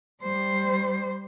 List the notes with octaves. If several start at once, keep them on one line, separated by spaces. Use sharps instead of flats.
G3 C5